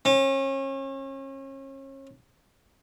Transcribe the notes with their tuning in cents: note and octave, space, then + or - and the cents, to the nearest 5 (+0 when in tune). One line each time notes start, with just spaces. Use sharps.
C#4 -35